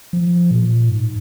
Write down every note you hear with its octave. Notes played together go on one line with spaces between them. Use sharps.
F3
A#2
G#2